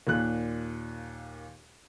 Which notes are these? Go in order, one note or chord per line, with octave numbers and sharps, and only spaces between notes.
D#2 A#2 F#6